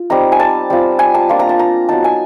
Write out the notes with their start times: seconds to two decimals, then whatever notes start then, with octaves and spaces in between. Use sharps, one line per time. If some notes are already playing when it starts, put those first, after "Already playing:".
Already playing: F4
0.10 G3 C4 D#4 A#5
0.32 G#5
0.40 A5
0.70 G3 C4 F4
0.99 G#5
1.14 A5
1.29 A#3 D4 F4
1.39 A#5
1.49 A5
1.59 A#5
1.89 F#3 B3 D#4 A5
2.04 G#5